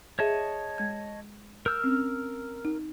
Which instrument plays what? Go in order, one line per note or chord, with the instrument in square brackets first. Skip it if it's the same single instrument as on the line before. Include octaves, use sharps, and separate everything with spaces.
[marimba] G#4 E5 [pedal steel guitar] C#5 D#5 A5
[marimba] G#3 G#6
[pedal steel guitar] A#4 E6 F6 [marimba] G6
[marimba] C4 C#4
D#4